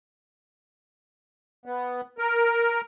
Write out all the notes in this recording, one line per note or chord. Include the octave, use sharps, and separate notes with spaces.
B3
A#4